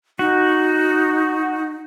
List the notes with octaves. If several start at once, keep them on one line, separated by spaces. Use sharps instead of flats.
D#4 F#4